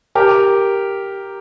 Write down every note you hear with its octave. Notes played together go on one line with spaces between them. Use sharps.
G4 A#4